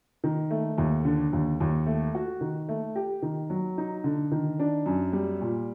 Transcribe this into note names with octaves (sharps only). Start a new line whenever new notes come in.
D#3
A3
D#2
D3
D#2
D#2
A3
F#4
D#3
A3
G4
D#3
F#3
D#4
D3
D#3
D4
F#2
G3
A#2